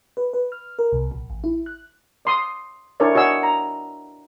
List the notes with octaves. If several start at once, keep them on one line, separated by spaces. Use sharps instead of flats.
B4
B4
F6
A#4
C2
A#1
A1
E4
F#6
D5 C6 D#6
D4 E4 A4 A#4 C#5 D5
F#4 C#5 D#5 G#5 E6
A#5